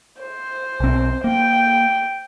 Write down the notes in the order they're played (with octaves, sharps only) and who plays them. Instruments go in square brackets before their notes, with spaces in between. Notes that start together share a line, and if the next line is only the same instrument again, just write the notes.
[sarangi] C5
[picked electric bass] B1 C4
[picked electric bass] A#3 [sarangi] G5